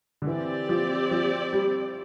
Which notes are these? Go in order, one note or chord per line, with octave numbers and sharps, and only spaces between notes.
D3
E3 C4 G4 D5
F3
F3
G3